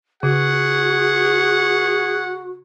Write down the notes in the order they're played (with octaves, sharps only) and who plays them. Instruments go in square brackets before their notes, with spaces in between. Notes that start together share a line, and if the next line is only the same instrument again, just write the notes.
[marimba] C#3 [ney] F#4 [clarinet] G#4 [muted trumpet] F#5